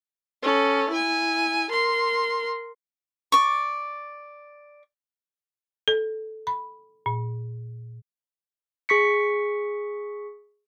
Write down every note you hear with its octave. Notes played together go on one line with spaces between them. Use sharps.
C#4 A4
E4 G#5
A#4 C6
D5 C#6
A4
B5
A#2
G#4 C#6 B6 C#7